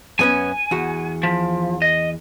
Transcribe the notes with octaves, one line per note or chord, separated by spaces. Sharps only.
F#2 B3 C#4 G#5
E2 F#4
F3
D#5